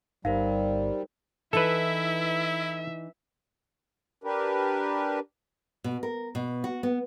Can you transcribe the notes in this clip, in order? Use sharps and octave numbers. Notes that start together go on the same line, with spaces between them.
G1 G3 D#4 A#4 C5 F5
E3 D#4 E4 A4 B4 E5
D4 G4 A#4 B4
B2
A#4
B2
F#4
B3